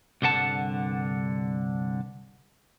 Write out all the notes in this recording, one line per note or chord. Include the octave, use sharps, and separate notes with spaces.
C2 G2 D3 F#5 A5